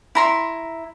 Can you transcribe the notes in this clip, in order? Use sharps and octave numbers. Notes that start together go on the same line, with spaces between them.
E4 A#5 C6